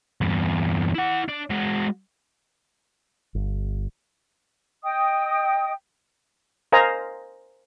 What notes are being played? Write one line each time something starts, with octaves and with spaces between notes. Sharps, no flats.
E2 G2
E4 F#5
D4
G#3 F#4
G1
D#5 G5 D#6
A#4 C5 D#5 F5 G#5 A#5